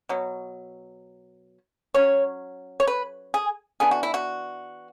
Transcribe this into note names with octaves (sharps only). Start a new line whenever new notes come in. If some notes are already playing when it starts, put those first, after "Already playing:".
B2 F#3
F#3 C#4 C#5
C#5
B4
G#4
E3 B3 D4 G#4
F#4
E4
F#4